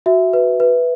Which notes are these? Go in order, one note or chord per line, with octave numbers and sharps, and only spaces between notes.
F#4 E5
B4
B4